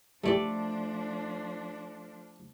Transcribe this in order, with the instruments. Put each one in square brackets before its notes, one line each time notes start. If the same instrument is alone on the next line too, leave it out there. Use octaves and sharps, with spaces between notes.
[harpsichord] G2 E4 G4 [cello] F3 D4 [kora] A3 D5